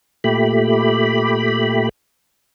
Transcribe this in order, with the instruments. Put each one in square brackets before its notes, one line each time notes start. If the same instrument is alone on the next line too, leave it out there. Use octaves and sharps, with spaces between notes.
[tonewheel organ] A#2 A3 G4 B5